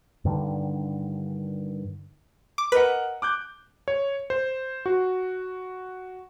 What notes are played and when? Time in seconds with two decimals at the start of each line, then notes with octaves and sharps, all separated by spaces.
0.25 G2 D3 D#3
2.58 D6
2.72 A#4 B4 D#5 F#5
3.22 D6 F#6 G6
3.88 C#5
4.30 C5
4.86 F#4